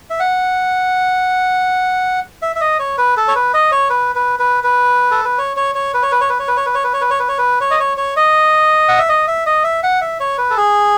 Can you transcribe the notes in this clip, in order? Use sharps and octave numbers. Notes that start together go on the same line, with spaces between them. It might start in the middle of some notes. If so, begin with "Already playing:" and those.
E5
F#5
E5
E5
D#5
C#5
B4
A4
C#5
B4
D#5
C#5
B4
B4
B4
B4
A4
B4
C#5
C#5
C#5
B4
C#5
B4
C#5
B4
C#5
B4
C#5
B4
C#5
B4
C#5
B4
C#5
B4
C#5
B4
C#5
D#5
C#5
C#5
D#5
F#5
E5
D#5
E5
D#5
E5
F#5
E5
C#5
B4
A4
G#4